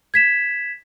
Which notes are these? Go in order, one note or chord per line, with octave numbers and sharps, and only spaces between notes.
G#6 B6 E7